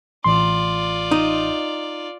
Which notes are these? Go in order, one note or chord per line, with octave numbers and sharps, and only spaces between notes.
A1 F4 D5 C6
D#4